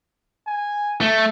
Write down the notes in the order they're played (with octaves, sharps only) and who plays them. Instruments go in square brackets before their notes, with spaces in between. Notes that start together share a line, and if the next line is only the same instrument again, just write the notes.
[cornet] G#5
[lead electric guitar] A3